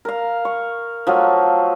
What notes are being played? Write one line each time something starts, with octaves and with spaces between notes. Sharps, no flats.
A#4 F5
C#6
F3 F#3 A3